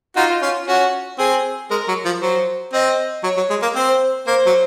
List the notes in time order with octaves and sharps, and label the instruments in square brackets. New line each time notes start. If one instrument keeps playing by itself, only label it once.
[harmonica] D#4 F#4 [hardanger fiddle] F4
[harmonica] C#4 F4
[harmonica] C#4 [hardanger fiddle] F#4
[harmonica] C4 [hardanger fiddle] G#4
[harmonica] G#3 [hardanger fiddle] A#4
[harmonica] F#3
F3
[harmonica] F#3 [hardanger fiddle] C5
[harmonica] C4 [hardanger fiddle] D#5
[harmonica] F#3 [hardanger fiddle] C#5
[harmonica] F#3
G#3
A#3
[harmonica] C4 [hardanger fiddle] C5
[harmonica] A#3 [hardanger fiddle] C5
[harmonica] F#3